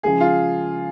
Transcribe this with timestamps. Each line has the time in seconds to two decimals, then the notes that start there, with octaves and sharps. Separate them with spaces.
0.03 C#3 F3 G#3 C#4 E4 G#4
0.20 F4